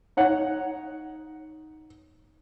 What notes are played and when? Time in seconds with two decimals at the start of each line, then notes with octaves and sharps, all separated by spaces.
0.17 D#4 C#5 F#5